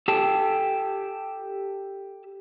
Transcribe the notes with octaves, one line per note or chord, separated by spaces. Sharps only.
G4 A4 G5 A5